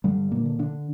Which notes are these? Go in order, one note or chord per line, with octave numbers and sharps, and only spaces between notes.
G2 D3 G3
A#2 A#3
D3
D3 D4